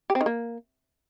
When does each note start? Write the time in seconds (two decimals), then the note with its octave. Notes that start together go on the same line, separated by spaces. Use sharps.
0.10 G4
0.15 C4
0.21 D#3
0.26 A#3